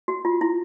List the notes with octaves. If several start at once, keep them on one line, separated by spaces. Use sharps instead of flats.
F#4
F4
E4